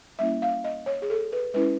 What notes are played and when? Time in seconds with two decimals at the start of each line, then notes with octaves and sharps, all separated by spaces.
0.19 G3 A#3 C#4 E4 E5
0.42 F5
0.64 D#5
0.86 C#5
1.02 G#4
1.10 A4
1.32 B4
1.54 G#3 C#4 E4 B4